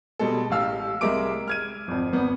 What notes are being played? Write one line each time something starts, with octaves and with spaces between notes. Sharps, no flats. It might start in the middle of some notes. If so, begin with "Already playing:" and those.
B2 G3 G#3 A4
A1 G4 F5 E6 F6
C2 G#3 A#4 E5 D6 D7
F6 G#6 D#7
G#1 F2
G#1 B3